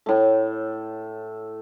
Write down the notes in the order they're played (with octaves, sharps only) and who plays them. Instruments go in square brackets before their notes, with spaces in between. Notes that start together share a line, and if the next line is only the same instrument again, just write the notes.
[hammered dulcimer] A2 A3